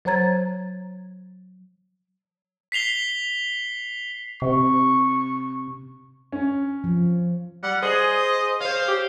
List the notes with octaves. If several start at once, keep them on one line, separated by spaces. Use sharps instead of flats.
F#3 C5 C#5 A#5 G#6 A6
B6 C7 F7 G7
C3 C#6
C#4
F3
G3 F#5
G#4 C5 D#5
C5 C#5 F5
G4